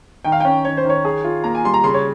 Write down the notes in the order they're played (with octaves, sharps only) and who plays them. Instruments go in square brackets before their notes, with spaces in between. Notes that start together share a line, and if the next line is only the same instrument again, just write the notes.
[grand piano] D#3 [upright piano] G5
[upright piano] F5
[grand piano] C#4 [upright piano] G5
[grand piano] D#3 [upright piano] C#5
[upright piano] C5
[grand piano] D#3 [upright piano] C#5
[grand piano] G#4
F4
[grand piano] A#3 [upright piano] A#5
[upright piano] G#5
[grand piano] G3 [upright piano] C6
[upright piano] A#5
[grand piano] C#3 [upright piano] C6
[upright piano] C#5